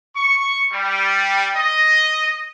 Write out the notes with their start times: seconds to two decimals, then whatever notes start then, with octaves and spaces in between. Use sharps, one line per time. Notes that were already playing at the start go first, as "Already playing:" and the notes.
0.16 C#6
0.73 G3
1.56 D#5